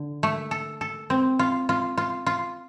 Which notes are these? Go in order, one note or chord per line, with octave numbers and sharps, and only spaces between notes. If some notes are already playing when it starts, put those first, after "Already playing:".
Already playing: D3
A3
A4
A4
C4
F4
F4
F4
F4